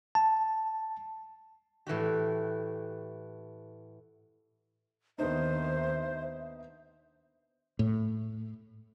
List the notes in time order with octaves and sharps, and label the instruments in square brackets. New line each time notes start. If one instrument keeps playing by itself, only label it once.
[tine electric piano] A5
[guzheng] A2 E3 F#4 G4
[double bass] D#2 D#3 [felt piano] B3 D4 D#4 [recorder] C5 [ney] E5
[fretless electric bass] A2